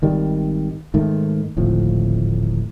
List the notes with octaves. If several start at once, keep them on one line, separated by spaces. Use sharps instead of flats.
G#1 D#3 G3
G#2 D#3 A3
D1 G#1 A2 F3